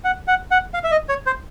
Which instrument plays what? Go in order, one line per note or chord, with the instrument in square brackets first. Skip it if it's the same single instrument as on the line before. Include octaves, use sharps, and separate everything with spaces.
[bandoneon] F#5
F#5
F#5
F5
E5
D#5
C#5
C5